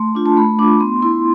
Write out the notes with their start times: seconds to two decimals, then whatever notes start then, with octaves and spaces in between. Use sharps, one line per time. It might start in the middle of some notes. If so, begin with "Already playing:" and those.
Already playing: A3 C6
0.15 D4 F4
0.26 A5
0.37 A3 B5
0.59 D4 D6
0.63 F4
0.80 B3 C6
1.02 E4 C6